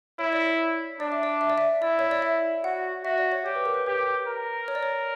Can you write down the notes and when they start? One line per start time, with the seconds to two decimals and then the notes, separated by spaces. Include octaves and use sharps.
0.19 E4 C#5
0.33 D5
0.46 C#5
1.00 D4 D5
1.12 E5
1.23 D5
1.41 E5
1.50 D5
1.58 E5
1.82 E4 D5
1.99 C#5
2.11 D5
2.22 E5
2.64 F#4 F#5
3.04 F#4 E5
3.18 D5
3.32 C#5
3.45 G4 C#5
3.55 B4
3.65 A#4
3.74 B4
3.86 G4 B4
4.27 A#4
4.68 C#5
4.75 D5
4.83 C#5